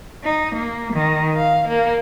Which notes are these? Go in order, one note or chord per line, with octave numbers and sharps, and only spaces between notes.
D#4
A#3
D#3
F5
A#3